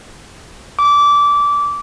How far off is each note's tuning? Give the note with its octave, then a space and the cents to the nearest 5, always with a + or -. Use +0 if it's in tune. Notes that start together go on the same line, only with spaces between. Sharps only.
D6 -20